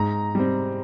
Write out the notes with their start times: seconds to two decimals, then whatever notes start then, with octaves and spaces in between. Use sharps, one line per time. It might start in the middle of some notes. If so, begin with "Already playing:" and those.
Already playing: G#2 A#5
0.35 G3 C4